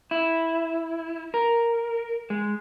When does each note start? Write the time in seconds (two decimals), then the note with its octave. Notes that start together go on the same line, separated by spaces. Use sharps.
0.11 E4
1.34 A#4
2.30 G#3